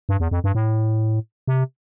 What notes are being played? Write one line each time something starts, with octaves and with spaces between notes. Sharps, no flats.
G2
E2
F2
G2
A2
C3